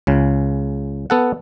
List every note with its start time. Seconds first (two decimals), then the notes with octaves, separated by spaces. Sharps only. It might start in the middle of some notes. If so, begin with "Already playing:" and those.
0.07 C#2 C#3
1.10 B3 A4 F#5